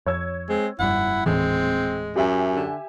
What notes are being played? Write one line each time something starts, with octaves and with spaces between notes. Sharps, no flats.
F2 C#5 E6 G#6
G#3 C4
F1 G2 E4 F#5
D#1 A2 E3 G#3 C4
F#2 G4 E5 G#5
D3